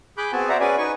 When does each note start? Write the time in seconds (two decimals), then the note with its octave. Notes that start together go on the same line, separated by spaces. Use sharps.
0.18 G#4 B5 D6 F#6 G6
0.32 B3 C4 F#4 G#4 G#5 A5
0.49 C5 D5 E5 F#5 A#5
0.60 C#4 F#4 G#4 B4 D5 G#5
0.78 D#4 B4 G#5 C#6